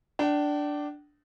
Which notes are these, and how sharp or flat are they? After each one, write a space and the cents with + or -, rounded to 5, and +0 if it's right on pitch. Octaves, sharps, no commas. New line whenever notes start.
D4 +0 G5 -40